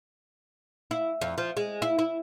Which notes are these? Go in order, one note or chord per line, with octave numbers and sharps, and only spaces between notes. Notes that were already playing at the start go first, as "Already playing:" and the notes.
E4
F2
F3
G#3
E4
E4